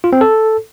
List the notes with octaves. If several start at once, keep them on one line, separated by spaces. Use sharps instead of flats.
F4
C4
A4